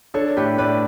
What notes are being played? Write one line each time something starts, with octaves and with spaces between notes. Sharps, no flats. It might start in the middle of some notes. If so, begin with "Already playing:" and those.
D4 A4 C#5
A2 G4 B4
A2 B4 D5